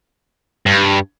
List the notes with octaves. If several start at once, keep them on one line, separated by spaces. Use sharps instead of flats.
G2